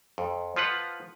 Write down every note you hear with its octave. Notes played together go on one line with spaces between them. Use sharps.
F2
F3 F4 B4 F#5